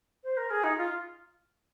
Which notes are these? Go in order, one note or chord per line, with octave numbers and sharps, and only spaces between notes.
C5
A#4
G#4
D#4
F4